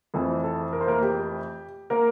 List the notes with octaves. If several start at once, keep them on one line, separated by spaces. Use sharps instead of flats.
F2 E3 A3 C4 A4
A4
A#4
C5
A#3 A#4
G4
A#3 A#4